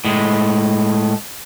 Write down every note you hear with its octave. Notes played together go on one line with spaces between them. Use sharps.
A2 G#3